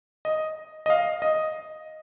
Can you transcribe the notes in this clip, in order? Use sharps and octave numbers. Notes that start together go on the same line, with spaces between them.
D#5
D#5
F5
D#5